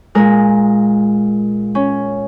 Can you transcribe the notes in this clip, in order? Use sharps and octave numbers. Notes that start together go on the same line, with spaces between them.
A#2 G#3 A#4
C#4